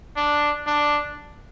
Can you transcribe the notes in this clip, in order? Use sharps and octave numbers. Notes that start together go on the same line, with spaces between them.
D4
D4